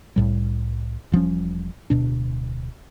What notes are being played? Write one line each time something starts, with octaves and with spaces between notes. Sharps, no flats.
C2 A2 G3
E1 F3 G3 C#4
D1 B2 D4